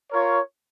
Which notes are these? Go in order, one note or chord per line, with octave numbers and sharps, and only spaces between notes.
F4 A#4 C#5